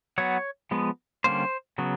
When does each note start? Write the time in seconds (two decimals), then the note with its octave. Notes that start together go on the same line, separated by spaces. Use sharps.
0.18 F#3 B3 C#5
0.71 F3 G#3 B3
1.24 D3 G3 A#3 C#4 C5
1.78 C#3 F#3 B3